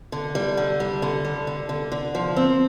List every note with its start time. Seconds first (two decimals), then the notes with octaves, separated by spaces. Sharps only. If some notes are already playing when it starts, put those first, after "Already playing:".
0.12 D3
0.35 G3
0.57 D3
0.80 G3
1.02 D3
1.25 G3
1.47 D3
1.69 D3
1.92 D3
2.15 F3
2.36 C4